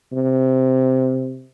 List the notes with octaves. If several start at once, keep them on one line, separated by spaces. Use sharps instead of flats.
C3